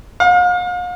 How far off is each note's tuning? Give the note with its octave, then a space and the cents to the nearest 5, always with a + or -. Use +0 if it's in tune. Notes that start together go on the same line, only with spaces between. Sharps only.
F5 +40